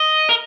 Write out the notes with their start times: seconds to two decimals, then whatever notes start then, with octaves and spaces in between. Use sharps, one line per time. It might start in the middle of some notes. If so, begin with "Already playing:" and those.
Already playing: D#5
0.29 A#4